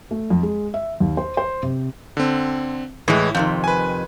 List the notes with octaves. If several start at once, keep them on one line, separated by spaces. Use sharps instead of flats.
A3
F2
G#3
E5
D#2
C5
C5
C3
D3 C4
A2 E3 G#3
F2 C3 D#3 G6
B4 G#5